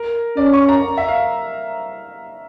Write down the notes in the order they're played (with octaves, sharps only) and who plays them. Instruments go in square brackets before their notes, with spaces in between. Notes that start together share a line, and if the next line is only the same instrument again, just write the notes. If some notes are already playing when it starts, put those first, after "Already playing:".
Already playing: [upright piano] A#4
[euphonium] C#4 [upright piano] D5
[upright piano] C#6
A#5
E5
F5